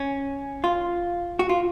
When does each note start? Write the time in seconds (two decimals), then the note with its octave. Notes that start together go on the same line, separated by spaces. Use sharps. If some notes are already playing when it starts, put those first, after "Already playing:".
Already playing: C#4
0.64 F4
1.39 F#4
1.49 F4